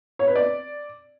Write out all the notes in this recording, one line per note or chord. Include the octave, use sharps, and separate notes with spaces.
C#5
B4
D5